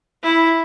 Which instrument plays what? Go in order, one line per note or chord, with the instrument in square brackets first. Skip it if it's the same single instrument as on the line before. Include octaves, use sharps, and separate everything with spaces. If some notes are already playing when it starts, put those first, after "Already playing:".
[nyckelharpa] E4